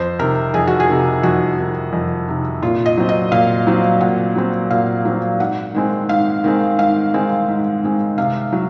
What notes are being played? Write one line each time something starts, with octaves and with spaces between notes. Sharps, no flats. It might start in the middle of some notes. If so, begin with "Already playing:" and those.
Already playing: F2 C5
C3 D#3 A#4
F2 G#4
F#4
G#4
C3 D#3
F2 F#4
C3 D#3
F2
C3 D#3
A#2 F4
D#5
F#3 C4
D#5
A#2 F5
F#3 C4
A#2 F#5
F#3 C4
A#2 F5
F#3 C4
G#2 F#5
D#3 G#3 C4
G#2 F5
D#3 G#3 C4
G#2 F5
D#3 G#3 C4
G#2
D#3 G#3 C4
C3 F5
F#3